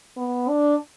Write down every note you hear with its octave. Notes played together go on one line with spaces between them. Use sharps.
B3
D4